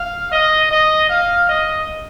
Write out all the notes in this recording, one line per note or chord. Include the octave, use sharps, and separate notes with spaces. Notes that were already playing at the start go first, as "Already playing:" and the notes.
Already playing: F5
D#5
D#5
F5
D#5